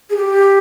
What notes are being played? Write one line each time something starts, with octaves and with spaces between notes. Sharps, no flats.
G#4
G4